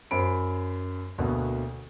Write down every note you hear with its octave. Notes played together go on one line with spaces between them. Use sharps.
F#2 C5 B5 D7
D2 B2 A#3